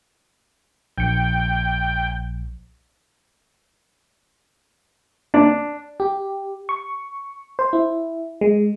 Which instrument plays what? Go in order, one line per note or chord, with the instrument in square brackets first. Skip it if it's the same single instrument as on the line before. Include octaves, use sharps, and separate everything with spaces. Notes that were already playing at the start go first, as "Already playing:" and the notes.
[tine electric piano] A#1 C#7 [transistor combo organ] G5
[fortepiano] D4
[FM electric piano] G4
C#6
C5
E4
G#3